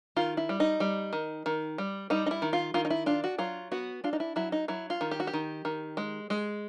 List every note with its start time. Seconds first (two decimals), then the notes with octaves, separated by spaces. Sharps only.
0.16 D#3 F4
0.37 E4
0.49 G3
0.60 D#4
0.80 G3
1.13 D#3
1.46 D#3
1.78 G3
2.10 G3 D#4
2.26 D#4
2.31 E4
2.42 D#3
2.53 F4
2.74 D#3 F4
2.85 D#4
2.90 E4
3.06 D4 F4
3.24 F#4
3.38 F#3 F4
3.72 B3 F#4
4.04 D4 F4
4.13 D#4
4.20 E4
4.36 F#3 E4
4.52 D#4
4.68 F#3 E4
4.90 F4
5.01 D#3
5.11 G4
5.20 F#4
5.27 G4
5.33 D#3
5.65 D#3
5.97 G#3
6.30 G#3